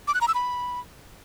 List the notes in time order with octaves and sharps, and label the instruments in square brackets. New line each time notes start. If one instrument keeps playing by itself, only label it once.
[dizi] D6
F#6
A#5
E6
B5